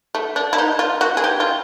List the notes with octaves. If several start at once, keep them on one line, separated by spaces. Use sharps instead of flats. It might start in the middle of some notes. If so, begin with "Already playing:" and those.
A3
D4
E4
D#4
F4
F#4
G#4
G4
F4